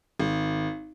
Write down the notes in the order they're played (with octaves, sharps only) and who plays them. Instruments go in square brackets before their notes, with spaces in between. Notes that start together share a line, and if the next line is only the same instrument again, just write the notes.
[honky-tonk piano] G#1